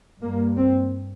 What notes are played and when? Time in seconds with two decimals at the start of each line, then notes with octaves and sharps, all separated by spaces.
0.21 G2 A#3
0.57 C4